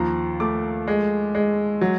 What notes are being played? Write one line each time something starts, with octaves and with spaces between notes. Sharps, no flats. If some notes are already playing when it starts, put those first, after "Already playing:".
Already playing: D#2 F3 A#5
A3 D6
G#3
G#3
F#3